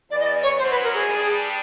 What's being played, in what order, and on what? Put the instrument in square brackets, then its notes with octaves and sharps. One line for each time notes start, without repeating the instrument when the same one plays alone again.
[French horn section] E2 E3 [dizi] D5
[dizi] D#5
D5
C#5
[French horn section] F#2 F#3 [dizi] C5
[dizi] B4
A#4
G#4
[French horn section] G2 G3